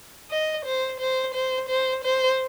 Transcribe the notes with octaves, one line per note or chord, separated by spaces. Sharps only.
D#5
C5
C5
C5
C5
C5